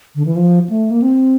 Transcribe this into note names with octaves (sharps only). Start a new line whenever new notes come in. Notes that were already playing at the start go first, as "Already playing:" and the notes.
D3
E3
F3
A3
A#3
C4